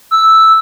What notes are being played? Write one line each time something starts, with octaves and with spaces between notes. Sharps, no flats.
E6